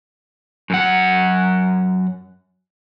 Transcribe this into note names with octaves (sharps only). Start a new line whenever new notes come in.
F#2 F#5